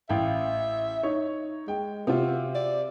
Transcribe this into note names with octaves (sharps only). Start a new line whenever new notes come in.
A1 E5 F5 G5
D#4 C#5
G#3 G5
C3 F4 F#4
D5